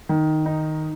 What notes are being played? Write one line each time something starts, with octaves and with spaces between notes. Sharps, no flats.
D#3
D#4